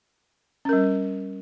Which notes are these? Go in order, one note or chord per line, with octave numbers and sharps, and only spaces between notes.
G3 C#4 A#4